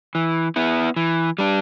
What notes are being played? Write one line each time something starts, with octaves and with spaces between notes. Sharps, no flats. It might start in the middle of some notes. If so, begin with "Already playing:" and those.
E3
B3 E4
E3
G3 D4